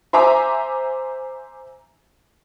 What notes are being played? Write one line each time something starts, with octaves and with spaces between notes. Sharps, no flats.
C5 E5 G#5 A#5 C6 D6